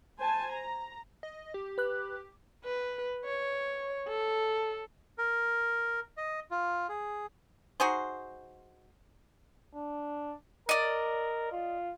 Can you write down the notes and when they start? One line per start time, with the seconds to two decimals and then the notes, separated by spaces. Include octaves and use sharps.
0.19 C5 G#5 A5
0.52 A#5
1.23 D#5
1.54 G4
1.78 B4 F#6
2.64 B4
3.25 C#5
4.07 A4
5.18 A#4
6.17 D#5
6.51 F4
6.89 G#4
7.80 D#4 F#4 G#4 C5
9.75 D4
10.69 A#4 D5 D#5
11.52 F4